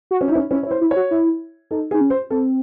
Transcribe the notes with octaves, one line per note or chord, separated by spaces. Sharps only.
F#4
C#4
D#4
E4
C#4
C#4 E4
C#5
E4
C5
E4
C#5
F#4
E4
D#4 A4
G#4
D#4
C#4
C5
C4 A4